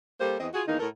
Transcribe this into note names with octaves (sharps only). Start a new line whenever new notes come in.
G3 A#3 G4 A4 C5
E2 C4 D#5
F4 F#4 G#4
E2 D#3 A#3 D#4
A2 A4 A#4